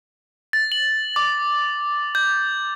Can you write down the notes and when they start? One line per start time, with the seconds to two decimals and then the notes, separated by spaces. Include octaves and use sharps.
0.53 A6
0.72 F#7
1.16 D6
2.15 G6